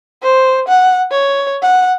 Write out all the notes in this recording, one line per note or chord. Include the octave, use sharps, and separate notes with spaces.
C5
F#5
C#5
F#5